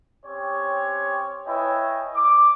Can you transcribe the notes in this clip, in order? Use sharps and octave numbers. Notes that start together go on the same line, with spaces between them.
C4 C#4 G4 C#5
E4 B4 C#5 D#5 G5 G#5
D6